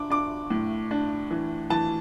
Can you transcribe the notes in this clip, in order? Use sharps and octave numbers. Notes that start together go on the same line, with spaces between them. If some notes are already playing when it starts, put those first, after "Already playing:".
Already playing: D4 D6
D4 D6
A2
D4
E3
E3 A5